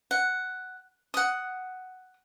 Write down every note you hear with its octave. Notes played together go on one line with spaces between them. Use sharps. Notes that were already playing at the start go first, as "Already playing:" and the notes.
F#5
F#5 D#6